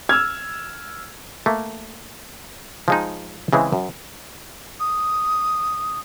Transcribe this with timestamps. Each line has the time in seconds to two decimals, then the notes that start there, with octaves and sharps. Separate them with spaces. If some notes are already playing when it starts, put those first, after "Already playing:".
0.09 E6 F6 G#6
1.46 A3 A#3
2.88 F3 G#3 D#4
3.53 C#3 E3 G#3 C4
3.73 F#2
4.80 D#6